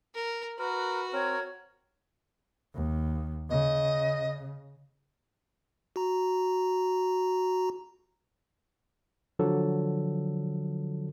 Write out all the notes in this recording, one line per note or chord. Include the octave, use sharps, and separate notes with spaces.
A#4
F#4 A#4 B4
C4 A#4 C#5
D#2
C#3 D#5
F#4 A#5
D3 F3 F#3 A4